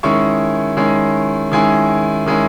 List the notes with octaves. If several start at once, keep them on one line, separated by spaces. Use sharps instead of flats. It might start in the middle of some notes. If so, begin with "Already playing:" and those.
D#3 G#3 C#4 E4 C#6
D#3 G#3 C#4 E4
D#3 G#3 C#4 E4 G#5
D#3 G#3 C#4 E4